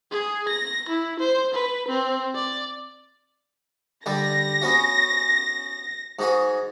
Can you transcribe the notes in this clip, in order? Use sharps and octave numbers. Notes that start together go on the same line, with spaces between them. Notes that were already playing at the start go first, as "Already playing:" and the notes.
G#4
A#6
E4
C5
B4
C4
D5
D3 G3 A#6
B3 C#4 F#4
G#2 F#4 G#4